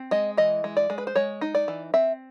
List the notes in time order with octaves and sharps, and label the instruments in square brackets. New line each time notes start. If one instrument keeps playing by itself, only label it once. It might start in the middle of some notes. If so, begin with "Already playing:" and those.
Already playing: [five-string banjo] C4
G#3 D#5
E3 D#5
G#3
D5
G#3
B4
C5
G#3 C#5
D#4
D5
E3
C4 E5